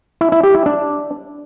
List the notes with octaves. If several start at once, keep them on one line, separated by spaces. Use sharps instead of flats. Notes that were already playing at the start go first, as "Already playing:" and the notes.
E4
E4
G4
E4
D4